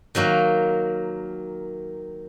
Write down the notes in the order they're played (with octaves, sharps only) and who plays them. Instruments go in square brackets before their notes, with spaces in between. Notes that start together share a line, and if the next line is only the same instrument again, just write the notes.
[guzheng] D#3 F#3 A#3 A#4